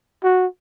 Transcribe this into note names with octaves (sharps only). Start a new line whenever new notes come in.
F#4